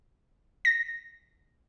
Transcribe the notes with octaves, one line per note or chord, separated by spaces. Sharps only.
A#6